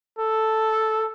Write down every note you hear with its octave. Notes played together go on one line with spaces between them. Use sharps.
A4